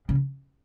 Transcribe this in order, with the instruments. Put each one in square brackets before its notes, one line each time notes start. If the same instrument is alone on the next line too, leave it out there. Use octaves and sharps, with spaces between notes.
[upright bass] C#3